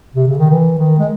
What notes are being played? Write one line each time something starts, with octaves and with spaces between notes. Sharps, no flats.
C3
C#3
D#3
E3
D#3
G#3